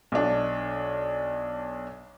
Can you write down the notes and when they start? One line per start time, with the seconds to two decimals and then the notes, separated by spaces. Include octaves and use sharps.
0.12 B1 D4